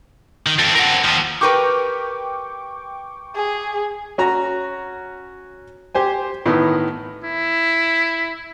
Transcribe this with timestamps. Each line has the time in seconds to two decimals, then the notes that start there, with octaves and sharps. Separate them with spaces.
0.46 D#3
0.59 C4 D4 F4 A4
0.75 A#4 F#5
1.04 D#2 F3
1.41 G4 A#4 B4 G5 C#6 D6
3.36 G#4
4.18 C#4 F#4 A#5
5.95 G4 C5 G#5
6.46 A2 D#3 E3 B3
7.24 E4